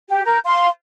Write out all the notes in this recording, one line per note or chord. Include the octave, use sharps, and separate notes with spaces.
G4
A#4 G6
F5 C6